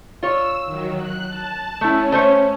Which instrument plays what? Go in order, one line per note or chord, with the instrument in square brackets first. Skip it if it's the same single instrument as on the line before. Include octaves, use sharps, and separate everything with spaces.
[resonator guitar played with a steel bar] F4 C#5 [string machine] E6
[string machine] D#3 F#3
F#6
A5
[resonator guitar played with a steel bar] A3 E4 [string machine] C#4
[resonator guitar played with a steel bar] A3 C5 C#5